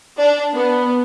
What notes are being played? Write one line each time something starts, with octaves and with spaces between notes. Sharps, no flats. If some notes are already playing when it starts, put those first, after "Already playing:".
D4
B3